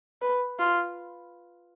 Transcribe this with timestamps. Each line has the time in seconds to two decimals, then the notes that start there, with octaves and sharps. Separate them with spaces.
0.22 B4
0.59 F4